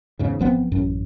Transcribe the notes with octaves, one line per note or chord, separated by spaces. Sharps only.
E2 G#2 C#3
G#1 F3 B3 C4
A1 F#2